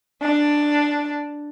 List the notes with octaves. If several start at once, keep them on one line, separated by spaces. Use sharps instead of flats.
D4